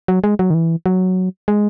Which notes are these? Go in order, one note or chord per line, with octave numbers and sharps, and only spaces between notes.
F#3
G#3
F#3
D#3
E3
F#3
G#3